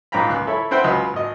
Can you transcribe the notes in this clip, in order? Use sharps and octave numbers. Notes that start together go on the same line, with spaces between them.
A#1 G#2 F4 G5 A#5 B5
C#2 F#6
E4 A4 C#5 B5
C4 E4 B4 C5 F#5 G5
C#2 F#3 B4 D#5
G#1 D#5